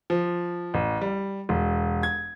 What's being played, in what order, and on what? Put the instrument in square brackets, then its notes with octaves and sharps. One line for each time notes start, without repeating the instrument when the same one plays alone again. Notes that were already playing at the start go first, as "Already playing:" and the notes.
[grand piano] F3
A1
G3
E1
G#6